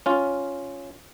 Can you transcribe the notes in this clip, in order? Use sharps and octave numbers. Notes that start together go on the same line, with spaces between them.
C#4 F4